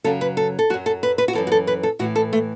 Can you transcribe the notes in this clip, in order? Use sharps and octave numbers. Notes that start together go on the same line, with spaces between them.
F#2 C#3 F#3 A4
B4
A4
A4
F#2 F#3 F#4
A4
B4
B4
F#4
F#2 E3 A4
F#4
A4
B4
A4
A2 E3 F#4
A4
A3